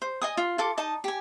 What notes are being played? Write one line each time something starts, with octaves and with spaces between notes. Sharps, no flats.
C5
D#5 G#5 D#6
F4
F4 A4 D6
D#4 D#5 A5
G4 G#5